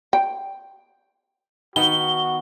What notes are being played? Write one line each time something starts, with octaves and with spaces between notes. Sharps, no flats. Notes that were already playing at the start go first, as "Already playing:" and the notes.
G5
D#3 B3 F#4 G7